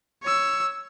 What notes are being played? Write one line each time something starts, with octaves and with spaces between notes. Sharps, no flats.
C#5 E6